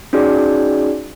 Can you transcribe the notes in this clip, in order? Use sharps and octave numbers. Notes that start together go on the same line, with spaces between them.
C#4 D#4 F#4 G#4 D5